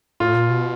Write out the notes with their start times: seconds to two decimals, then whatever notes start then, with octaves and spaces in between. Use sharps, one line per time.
0.20 A2 F4
0.35 A#2
0.49 B2